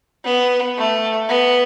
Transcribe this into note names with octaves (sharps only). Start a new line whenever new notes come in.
B3
A3
B3